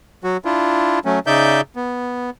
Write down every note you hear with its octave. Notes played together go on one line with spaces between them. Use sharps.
F#3 F#4
D4 E4 F4
F#3 A3 C#4
C#3 D#4 D5 E5 G6
B3